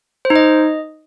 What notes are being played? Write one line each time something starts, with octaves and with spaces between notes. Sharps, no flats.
C5
D#4
D#5